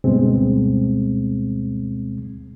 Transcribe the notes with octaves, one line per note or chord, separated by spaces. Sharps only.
D2 G2 B2 G#3 C4